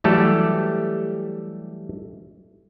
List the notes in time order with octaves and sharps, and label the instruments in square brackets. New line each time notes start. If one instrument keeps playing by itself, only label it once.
[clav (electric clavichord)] E3 F#3 G3 A3 G4 A4